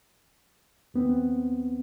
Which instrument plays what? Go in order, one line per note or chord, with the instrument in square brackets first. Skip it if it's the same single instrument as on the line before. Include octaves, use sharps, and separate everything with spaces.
[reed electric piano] D#2 B3 C4